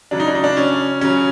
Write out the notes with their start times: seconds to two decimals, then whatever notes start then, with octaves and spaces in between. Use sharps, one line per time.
0.11 C#3 F#3 D4
0.20 D#4
0.28 D4
0.35 D#4
0.44 D4
0.57 C#4
1.01 C#3 F#3 C#4